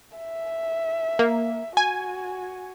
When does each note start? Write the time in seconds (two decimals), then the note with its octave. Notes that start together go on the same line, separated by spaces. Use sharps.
0.17 E5
1.19 A#3
1.77 F#4 G#5